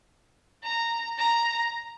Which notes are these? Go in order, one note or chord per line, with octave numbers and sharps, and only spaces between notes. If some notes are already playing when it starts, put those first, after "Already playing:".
A#5
A#5